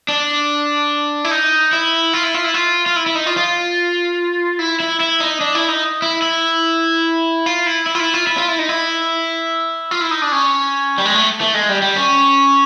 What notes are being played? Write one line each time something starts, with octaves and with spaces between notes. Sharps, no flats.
D4
E4
D#4
E4
F4
E4
F4
E4
F4
F4
E4
E4
D#4
F4
F4
E4
E4
E4
D#4
D4
E4
D#4
E4
E4
F4
E4
E4
F4
E4
F4
E4
F4
E4
D#4
E4
F4
E4
D#4
D4
C#4
G3
G#3
A3
A3
G#3
G3
G3
C#4